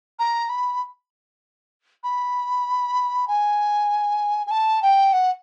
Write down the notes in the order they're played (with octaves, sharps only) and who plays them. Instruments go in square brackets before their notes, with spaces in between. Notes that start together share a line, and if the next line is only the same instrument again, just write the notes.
[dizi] A#5
B5
B5
G#5
G#5
A5
G5
F#5